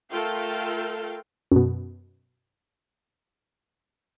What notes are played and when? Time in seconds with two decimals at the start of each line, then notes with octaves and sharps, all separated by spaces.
0.11 A3 F4 A4 A#4 F5 G5
1.52 F#2 B2